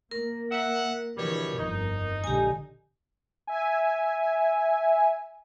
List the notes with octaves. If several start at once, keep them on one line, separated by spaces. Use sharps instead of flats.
A#3 A#4
E5 F#5
B2 D3 E3 F3 G3 C#5
G1 F2 D#4
A#1 D3 G#3 G4 G#5
E5 G#5